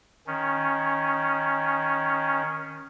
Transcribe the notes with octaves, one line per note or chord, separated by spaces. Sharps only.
D#3 C#4